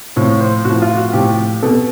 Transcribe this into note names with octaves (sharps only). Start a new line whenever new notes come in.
A2 F3 C#5
C5
A2 F#4
F3
F4
F#4
A2 F3 G4
B2 A4